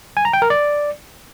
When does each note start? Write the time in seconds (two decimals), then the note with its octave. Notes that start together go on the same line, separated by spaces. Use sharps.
0.17 G#5
0.25 A#5
0.33 G5
0.42 A#4
0.50 D5